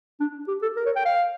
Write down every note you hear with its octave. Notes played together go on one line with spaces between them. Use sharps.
D4
G4
A4
A#4
C#5
G5
F5